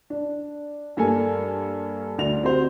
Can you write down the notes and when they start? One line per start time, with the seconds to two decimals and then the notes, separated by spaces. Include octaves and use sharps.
0.10 D4
0.97 G2 A#3 A4 G#5
2.18 D2 D5 F7
2.43 C4 F#4 G4 C5